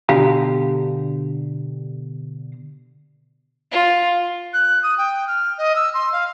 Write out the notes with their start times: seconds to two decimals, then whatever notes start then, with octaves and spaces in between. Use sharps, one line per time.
0.09 B2 D3 G4 F5 A#5
3.72 F4
4.53 F#6
4.83 D#6
4.98 G5
5.28 F6
5.58 D#5
5.76 E6
5.94 C6
6.13 F5